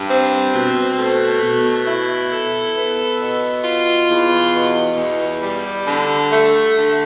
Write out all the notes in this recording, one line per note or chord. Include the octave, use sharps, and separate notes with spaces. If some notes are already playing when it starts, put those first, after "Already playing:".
Already playing: G2
C4
B2
A3
B2
E4
A4
B3
B2
F4
E2
B2
E2
G3
D3
A3
D3